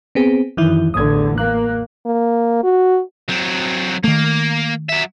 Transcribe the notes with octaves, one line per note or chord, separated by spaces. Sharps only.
B3 C4 G#4
F#2 D#3 E3 E4
A1 E2 D3 D#6 G#6
A#3 F#6
A#3
F#4
F#3 C4
D#3 A3 A#3
F#3 E5